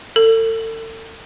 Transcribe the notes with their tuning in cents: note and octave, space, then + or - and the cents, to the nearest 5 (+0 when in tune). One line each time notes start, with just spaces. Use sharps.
A4 +40